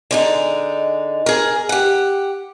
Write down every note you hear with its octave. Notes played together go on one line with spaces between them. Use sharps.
D3 G#3 D#4
G#4 A#4
G4 F#5